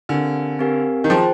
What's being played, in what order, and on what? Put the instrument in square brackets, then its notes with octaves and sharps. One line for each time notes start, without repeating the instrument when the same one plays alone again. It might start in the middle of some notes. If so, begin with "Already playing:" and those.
[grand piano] D3 [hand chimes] C4 G4 A#4 F5 G#5
[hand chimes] C4 G4 A#4 F5 G#5
[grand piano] D#3
[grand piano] F3 [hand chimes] G#4 C5 G5